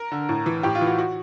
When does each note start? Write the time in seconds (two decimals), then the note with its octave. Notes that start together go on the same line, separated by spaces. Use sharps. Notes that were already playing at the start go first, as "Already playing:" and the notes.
Already playing: A#4
0.12 D3
0.29 A2
0.46 E3
0.63 A2 G4
0.75 F4
0.81 E3
0.87 F#4
0.98 F#4